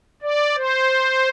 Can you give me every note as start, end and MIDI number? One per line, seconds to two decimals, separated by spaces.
0.22 0.56 74
0.56 1.29 72